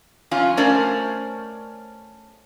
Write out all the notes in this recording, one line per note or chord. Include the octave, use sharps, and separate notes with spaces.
F2 C#4 F4
A3 C#4 A#4 C5 D5